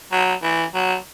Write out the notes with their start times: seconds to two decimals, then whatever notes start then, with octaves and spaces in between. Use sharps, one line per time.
0.12 F#3
0.43 E3
0.74 F#3